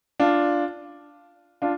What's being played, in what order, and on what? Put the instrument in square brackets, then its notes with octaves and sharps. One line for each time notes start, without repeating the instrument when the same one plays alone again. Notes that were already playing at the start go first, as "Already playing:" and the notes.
[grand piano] D4 F4
D4 F4